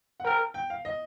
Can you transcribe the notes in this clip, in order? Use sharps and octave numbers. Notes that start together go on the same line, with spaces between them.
F#5
A#4 G5
G5
F5
D#5